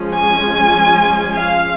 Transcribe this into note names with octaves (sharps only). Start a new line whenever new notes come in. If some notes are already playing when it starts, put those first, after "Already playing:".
Already playing: F3 G#3 C#4
G#5
F5